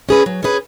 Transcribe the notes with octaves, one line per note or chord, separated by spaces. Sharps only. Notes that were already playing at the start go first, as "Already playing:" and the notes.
C#4 G#4 B4
F#3
C#4 G#4 B4